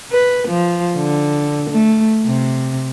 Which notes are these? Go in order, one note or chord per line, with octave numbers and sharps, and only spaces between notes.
B4
F3
D3
A3
C3